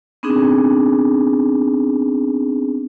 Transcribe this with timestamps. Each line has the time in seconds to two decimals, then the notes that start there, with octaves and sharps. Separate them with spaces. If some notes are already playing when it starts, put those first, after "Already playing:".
0.23 B3 C4 D4 D#4 G#4